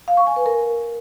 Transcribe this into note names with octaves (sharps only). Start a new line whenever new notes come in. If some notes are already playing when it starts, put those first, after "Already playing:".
F5
C#6
G#5
B4
A#4